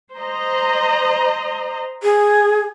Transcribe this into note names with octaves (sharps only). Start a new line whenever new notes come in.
C5 D#5 A#5
G#4